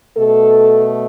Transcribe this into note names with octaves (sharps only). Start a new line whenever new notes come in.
B2 A3 A4